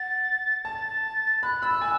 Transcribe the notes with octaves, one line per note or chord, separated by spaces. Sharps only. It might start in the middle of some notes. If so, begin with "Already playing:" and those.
Already playing: F#5 A6
A5 A6
B5 F#6
B5 E6
G#5